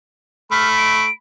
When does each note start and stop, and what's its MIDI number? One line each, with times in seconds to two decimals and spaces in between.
0.51 1.06 57
0.51 1.09 83
0.51 0.69 89
0.78 1.11 98